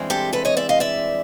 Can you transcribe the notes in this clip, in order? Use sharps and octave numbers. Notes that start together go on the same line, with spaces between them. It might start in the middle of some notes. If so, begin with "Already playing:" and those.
Already playing: G2 E3 G#3 C4
G4 A4
A4 B4
C#5 D#5
D5 E5
D#5 F5
D5 E5